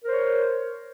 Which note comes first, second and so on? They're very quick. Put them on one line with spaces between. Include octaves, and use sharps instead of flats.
A#4 C5 C#5